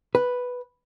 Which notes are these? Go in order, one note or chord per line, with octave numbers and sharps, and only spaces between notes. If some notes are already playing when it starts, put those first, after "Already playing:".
B4